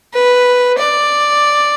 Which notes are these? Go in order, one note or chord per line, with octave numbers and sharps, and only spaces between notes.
B4
D5